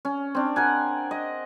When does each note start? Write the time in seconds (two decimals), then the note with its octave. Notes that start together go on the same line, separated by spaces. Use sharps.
0.05 C#4
0.35 C4 D4
0.56 A#4 F#5 G#5
1.11 D#5